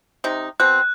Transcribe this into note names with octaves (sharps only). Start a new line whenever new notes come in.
C3 D#4
B2 C4 F#6